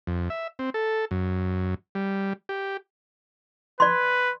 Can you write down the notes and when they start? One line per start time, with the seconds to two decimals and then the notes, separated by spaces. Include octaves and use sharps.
0.07 F2
0.30 E5
0.59 C4
0.74 A4
1.11 F#2
1.95 G3
2.49 G4
3.80 B4 D5 C6